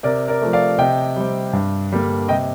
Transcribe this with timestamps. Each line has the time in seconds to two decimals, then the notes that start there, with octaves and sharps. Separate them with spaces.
0.03 C3 A#4 D5
0.28 A#4 D5
0.42 F3 A3
0.53 D5 F5
0.78 C3 D#5 G5
1.17 G3 C4
1.53 G2
1.91 D3 G3 A#3
2.28 C3 D#5 G5